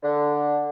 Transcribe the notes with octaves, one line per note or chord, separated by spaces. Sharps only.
D3